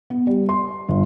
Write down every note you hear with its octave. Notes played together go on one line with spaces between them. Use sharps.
B3
G3
C6
G1